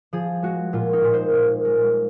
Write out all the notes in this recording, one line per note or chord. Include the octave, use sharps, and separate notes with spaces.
F3 G#4
G#3 F#4
A#2 F4
D#4
A#2
C5
A#2
G#3